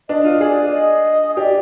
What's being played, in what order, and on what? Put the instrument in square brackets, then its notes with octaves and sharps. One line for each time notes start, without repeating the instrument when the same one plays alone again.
[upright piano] D4 [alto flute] D#5
[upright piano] F4
[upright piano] G#4 [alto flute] D5
[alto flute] D#5
[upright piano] G4 [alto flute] D5